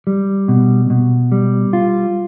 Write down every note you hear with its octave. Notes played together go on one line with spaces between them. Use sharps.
G3
B2
B2
G3
F4